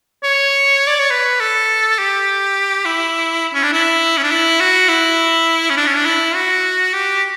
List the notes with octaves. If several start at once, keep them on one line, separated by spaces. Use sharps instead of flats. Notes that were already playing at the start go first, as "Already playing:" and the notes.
C#5
D5
C#5
B4
A4
G4
E4
C#4
D4
E4
C#4
D4
E4
F#4
E4
C#4
D4
C#4
D4
E4
F#4
G4